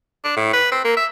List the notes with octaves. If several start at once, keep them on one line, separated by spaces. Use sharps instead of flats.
D4
A2
B4
C4
A#3
E5